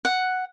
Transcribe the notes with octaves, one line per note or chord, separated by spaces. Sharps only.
F#5